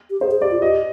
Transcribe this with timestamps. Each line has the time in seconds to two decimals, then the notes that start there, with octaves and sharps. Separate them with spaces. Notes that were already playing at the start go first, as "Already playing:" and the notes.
0.10 G4
0.21 G#4 C5
0.31 G#4
0.41 G4 D5
0.51 F4
0.62 G4 D#5